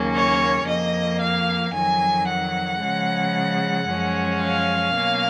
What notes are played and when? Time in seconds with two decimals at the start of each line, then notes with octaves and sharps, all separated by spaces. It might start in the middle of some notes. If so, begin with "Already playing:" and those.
Already playing: D#2 C#3 F#3 A#3 C#4
0.14 C#5
0.67 F2 F3 A#3 D#5
1.21 F5
1.74 F2 D#3 F#3 G#5
2.28 F#5
2.81 C#3 F3 G#3
3.89 F#2 F3 G#3 C#4
4.43 F5
4.96 B2 F#3 A#3 C#4